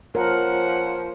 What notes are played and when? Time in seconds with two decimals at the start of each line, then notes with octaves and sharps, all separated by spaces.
0.15 F3 C#4 A#4 F#5